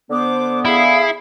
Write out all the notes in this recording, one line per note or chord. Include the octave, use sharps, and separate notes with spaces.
D3 B3 C5 D6
E4 G#4 F5